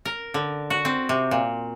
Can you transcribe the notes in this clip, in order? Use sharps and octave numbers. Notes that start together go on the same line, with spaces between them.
A#4
D3
F#4
C4
C3
A#2